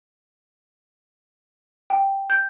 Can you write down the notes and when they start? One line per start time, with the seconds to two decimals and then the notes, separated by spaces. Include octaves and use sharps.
1.90 G5
2.30 G6